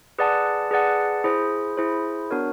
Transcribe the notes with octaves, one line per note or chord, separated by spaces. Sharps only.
G#4 B4 D5 F#5 A5
G#4 B4 D5 F#5 A5
E4 G#4 C5
E4 G#4 C5
B3 D4 F#4 A#4 C#5